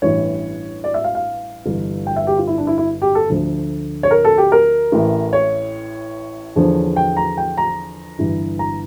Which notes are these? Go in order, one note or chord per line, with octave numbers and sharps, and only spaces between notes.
A1 G2 E3 C#5
D5
E5
F5
F5
G1 G2 E3
G5
E5
G4
F4
E4
D4
E4
E4
G4
A4
D2 D3 F3
C#5
A#4
A4
G4
A#4
A1 A2 E3
C#5
E2 D3 F3
G5
A#5
G5
A#5
G1 G2 E3
A#5